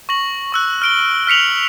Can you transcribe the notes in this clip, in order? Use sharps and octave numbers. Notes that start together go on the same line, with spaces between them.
C#6 A#6 F#7
C#6 E6 F#6
F6 D7 G7
F6 B6 C#7 F7 F#7